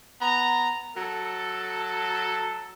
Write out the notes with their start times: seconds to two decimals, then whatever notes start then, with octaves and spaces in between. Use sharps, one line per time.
0.20 B3 A#5
0.96 F#3 A4